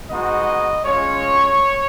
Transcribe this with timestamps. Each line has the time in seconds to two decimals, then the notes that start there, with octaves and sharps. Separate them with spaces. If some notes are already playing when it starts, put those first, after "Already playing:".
0.10 G#3 B3 D#4 F#4 D#5
0.85 G#3 C#4 F4 C#5